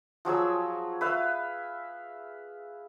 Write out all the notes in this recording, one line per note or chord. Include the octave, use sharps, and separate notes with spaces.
F3 F#3 G#4 E6
B4 E5 F5